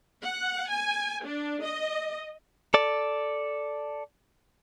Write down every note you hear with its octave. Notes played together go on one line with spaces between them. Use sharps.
F#5
G#5
D4
D#5
A4 D5